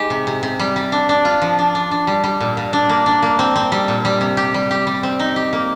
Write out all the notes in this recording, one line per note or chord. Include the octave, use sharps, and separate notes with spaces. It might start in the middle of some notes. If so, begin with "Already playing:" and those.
Already playing: G#3 D#4 G4
C3
C3
C3
G3
G3
D4
D4
F4
F3
D4
D4
D4
G3
G3
A#2
A#2
D4
A#3
D4
A#3
C4
C4
G3
A#2
G3
C3
G4
G3
G4
G3
C4
D#4
G4
A#3